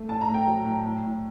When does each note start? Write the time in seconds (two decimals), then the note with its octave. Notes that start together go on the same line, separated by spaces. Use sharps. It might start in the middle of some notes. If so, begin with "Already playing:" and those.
Already playing: A3
0.09 A2 A5
0.21 A#5
0.28 A3
0.34 G5
0.47 F#3
0.65 A2
0.85 A2
1.03 A2